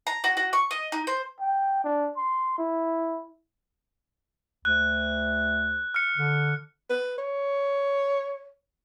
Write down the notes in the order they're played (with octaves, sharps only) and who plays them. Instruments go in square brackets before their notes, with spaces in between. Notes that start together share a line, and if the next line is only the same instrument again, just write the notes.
[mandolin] A#5
F#4
F#4
C#6
D#5
D#4
C5
[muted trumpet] G5
D4
C6
E4
[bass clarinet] D2 [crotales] F#6
[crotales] F6 C#7
[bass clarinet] D3
[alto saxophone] B4
C#5